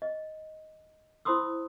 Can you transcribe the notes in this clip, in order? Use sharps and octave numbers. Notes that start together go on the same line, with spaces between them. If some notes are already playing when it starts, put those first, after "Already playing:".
D#5
E4 C5 B5 C6 D#6 E6